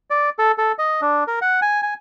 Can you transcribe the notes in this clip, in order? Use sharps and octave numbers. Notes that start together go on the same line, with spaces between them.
D5
A4
A4
D#5
D4
A#4
F#5
G#5
G#5